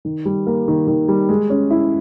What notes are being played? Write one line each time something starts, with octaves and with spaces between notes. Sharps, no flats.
D#3
G3
A#3
D#3
D#3
G3
G#3
C#4
E4